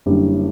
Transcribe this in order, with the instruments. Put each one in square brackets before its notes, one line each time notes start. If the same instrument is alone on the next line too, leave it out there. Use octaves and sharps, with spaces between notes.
[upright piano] F#1 F#2 D3 G3